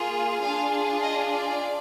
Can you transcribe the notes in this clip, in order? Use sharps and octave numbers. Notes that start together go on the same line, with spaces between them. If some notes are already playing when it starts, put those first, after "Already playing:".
Already playing: A#3 F4 G#4
D4 F4 G#4 F5
D#5
D5